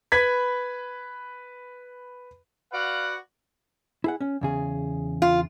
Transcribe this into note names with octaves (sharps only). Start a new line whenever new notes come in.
B4 B5 G#6 B6
F#4 B4 D5 F5 F#5
E4 G#4 F#5
C#4
E2 C#3 G#4
F4